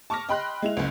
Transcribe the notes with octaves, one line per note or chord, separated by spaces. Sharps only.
A5 C#6 D6 F6 A#6
D#5 G5 B5 C6 F#6
G#3 E4 F7
F#1 C#2